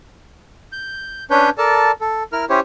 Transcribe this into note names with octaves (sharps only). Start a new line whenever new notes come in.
G6
C#4 D4 B4 C#5 G6
A4 A#4 D5 A5
A4
E4 A#4 F6
C#4 E4 G4 C5 C#5